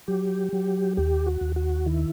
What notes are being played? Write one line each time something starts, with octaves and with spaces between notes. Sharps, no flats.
F#3 G4
F#3
D#2 G4
F#4
D#2
F#4
D#3 E4